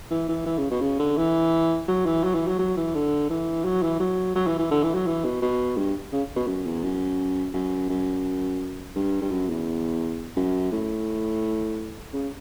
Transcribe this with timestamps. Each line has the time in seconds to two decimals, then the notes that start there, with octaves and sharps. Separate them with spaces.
0.11 E3
0.29 E3
0.47 E3
0.58 C#3
0.71 B2
0.82 C#3
1.00 D3
1.17 E3
1.88 F#3
2.06 E3
2.24 F#3
2.35 E3
2.48 F#3
2.59 F#3
2.77 E3
2.95 D3
3.30 E3
3.64 F#3
3.83 E3
4.00 F#3
4.36 F#3
4.47 E3
4.59 E3
4.71 D3
4.84 E3
4.95 F#3
5.07 E3
5.25 B2
5.42 B2
5.77 G2
6.13 C#3
6.36 B2
6.47 F#2
6.66 E2
6.84 F#2
7.54 F#2
7.90 F#2
8.96 G2
9.22 G2
9.31 F#2
9.49 E2
10.37 F#2
10.72 A2
12.13 C#3